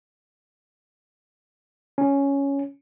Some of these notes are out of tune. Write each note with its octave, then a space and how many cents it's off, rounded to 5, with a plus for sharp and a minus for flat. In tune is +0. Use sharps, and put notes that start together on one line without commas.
C#4 +5